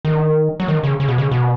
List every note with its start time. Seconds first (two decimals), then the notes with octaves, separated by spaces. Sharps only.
0.05 D#3
0.60 F#3
0.68 D#3
0.83 C#3
1.00 C#3
1.08 B2
1.18 C#3
1.31 B2